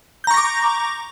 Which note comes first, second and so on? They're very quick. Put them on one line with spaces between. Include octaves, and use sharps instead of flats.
G6 A#5 C#6 A#6 D6